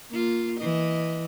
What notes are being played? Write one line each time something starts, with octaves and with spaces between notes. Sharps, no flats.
A#3 F4
E3 D#5